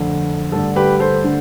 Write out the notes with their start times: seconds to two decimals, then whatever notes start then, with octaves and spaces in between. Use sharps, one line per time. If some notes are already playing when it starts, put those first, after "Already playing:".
Already playing: F2 D3 A3
0.52 G2 D3 A3 D4 A4
0.76 G4 B4
1.00 A4 C5
1.24 D3 A3 D4